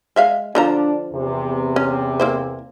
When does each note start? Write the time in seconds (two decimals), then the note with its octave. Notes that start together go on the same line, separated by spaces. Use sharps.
0.16 G#3 E5 F5
0.55 D3 F3 D4 A#5
1.13 E2 C3
1.76 C#4
2.20 A#3 E4 C5